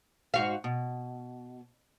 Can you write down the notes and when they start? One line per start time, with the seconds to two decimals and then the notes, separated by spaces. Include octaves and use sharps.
0.34 G#2 F#4 F5
0.64 B2